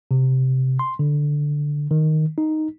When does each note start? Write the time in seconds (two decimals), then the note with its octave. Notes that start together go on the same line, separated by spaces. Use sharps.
0.11 C3
0.79 C6
0.99 D3
1.91 D#3
2.38 D#4